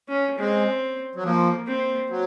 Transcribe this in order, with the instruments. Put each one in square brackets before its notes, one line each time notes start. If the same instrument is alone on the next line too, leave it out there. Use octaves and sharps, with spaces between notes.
[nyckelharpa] C#4
[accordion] G#3 [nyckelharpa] C4
[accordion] F#3
[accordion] F3 [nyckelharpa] A#3
[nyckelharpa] C4
[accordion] F#3